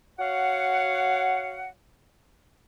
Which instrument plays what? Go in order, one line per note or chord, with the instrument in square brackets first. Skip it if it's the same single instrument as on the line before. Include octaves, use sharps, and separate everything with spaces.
[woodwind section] F#4 C#5 F5 F#5